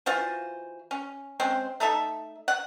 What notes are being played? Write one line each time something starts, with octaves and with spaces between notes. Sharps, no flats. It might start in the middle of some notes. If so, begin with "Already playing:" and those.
E3 F4 F#4 C5
C#4
G#3 C4 C#4 C5
A3 D#4 A4 E5
F#5